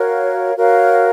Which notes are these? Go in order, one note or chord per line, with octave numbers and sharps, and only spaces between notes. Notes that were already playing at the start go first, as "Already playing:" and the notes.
Already playing: F#4 A#4 C#5 F5
F#4 A#4 C#5 F5